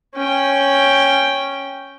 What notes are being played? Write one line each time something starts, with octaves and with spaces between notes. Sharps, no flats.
C#4 G5